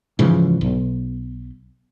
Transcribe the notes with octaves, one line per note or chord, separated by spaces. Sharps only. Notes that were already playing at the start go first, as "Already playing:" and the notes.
G#2 C#3 E3 F3
B1